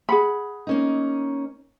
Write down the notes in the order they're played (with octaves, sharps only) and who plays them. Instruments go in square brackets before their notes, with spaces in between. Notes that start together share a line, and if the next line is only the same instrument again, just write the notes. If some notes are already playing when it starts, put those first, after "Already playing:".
[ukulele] G#4 F#5 B5
[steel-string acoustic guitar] A#3 C#4 D#4